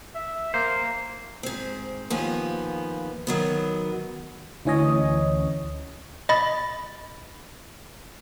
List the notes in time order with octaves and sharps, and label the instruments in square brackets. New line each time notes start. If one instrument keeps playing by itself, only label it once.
[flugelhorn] E5
[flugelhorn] A#3 [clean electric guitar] C5
[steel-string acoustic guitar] G#2 C4
D#2 F3 B3 G#5
D#3 F#3 B3
[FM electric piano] D2 E3 C#4 C#5 D#5
[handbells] D#5 B5 A6